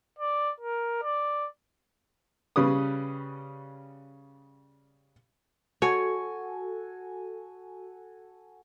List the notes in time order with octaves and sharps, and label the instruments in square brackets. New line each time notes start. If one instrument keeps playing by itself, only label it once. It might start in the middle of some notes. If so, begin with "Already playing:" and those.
[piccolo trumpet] D5
A#4
D5
[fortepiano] C#3 G3 C#4 B4 D#6
[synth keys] F#4 A4 G#5 [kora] C#5